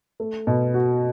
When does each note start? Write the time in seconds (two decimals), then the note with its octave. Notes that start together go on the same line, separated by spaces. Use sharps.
0.20 A3
0.47 B2
0.74 F#4